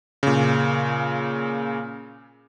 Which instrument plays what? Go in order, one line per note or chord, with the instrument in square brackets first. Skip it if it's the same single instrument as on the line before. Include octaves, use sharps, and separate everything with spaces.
[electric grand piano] A#2 C#3